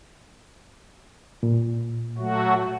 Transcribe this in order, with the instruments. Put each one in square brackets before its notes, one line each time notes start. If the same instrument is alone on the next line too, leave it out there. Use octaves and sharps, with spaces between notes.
[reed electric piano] A#2
[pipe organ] F#3 A3 F#4